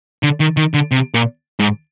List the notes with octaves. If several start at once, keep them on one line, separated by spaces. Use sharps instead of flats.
D3
D#3
D#3
D3
C3
A#2
G#2